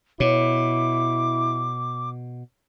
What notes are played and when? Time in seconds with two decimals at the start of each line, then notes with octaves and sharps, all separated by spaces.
0.20 B2 E4 C#5 D6